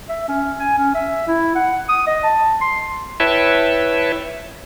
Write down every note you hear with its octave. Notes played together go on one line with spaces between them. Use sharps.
E5
C#4
G#5
C#4
E5
E4
F#5
D#6
D#5
A5
C6
E4 B4 C#5 E5 G5 A5